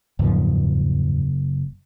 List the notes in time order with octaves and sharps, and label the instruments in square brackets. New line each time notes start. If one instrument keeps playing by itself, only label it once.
[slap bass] F#1 [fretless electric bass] E2 G#2 F3